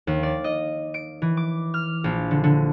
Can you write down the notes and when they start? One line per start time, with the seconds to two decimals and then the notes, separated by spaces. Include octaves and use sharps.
0.07 D#2
0.23 D5
0.44 D#5
0.94 D7
1.22 E3
1.37 D6
1.74 F6
2.04 A#1
2.31 D3
2.44 D3